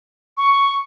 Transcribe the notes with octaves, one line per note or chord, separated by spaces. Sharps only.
C#6